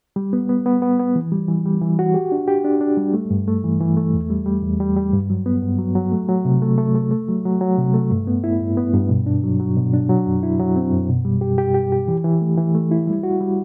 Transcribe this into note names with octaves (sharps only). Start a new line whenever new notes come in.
G3
B3
B3
B3
B3
B3
E3
G3
E3
G3
E3
F#4
G4
D4
G4
D4
D4
G3
A3
G2
A3
E3
E3
A3
E2
G3
G3
E2
G3
G3
G2
F#3
B3
G2
F#3
F#3
A3
F#3
C3
A3
A3
A3
A3
F#3
F#3
F#3
C3
A3
G2
B3
E4
G2
B3
G2
B2
D4
F#3
F#3
B2
D4
F#3
F#2
E4
F#3
C4
F#2
B2
G3
G4
G4
G4
G4
E3
E3
A3
E3
A3
E4
G3
F#4
G3